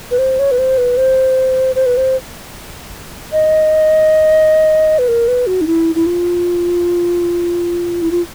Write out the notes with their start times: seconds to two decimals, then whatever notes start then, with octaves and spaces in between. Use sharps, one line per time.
0.11 B4
0.19 C5
0.39 C#5
0.51 B4
0.59 C5
0.78 B4
0.97 C5
1.76 C5
1.86 B4
1.97 C5
3.33 D#5
4.99 B4
5.08 A#4
5.28 B4
5.47 F#4
5.61 D#4
5.67 E4
5.95 E4
6.06 F4
8.02 E4
8.11 F4